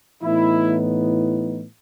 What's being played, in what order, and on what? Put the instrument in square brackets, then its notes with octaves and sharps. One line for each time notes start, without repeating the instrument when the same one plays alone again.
[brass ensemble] A2 E3 B3 D#4 E4